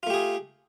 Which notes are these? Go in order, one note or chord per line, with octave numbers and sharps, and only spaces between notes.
A3 F4 G4 G#4